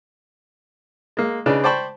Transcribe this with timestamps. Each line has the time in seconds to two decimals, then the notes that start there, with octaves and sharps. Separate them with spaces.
1.17 G#3 A#3
1.46 C#3 D4 D#4 G#4 B4
1.64 C5 D5 G5 A5 B5 C#6